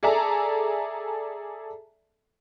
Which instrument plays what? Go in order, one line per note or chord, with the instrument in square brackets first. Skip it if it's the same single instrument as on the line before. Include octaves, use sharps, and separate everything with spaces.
[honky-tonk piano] G#4 A4 D5 E5 A5 A#5